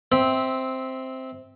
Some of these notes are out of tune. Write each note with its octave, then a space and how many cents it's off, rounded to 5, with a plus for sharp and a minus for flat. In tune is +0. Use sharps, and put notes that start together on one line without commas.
C4 +0 E5 -20